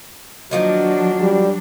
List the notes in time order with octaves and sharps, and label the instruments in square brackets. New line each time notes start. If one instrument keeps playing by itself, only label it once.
[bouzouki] D#3 F3 A#3 [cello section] F#3 D4 [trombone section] F#4
[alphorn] G3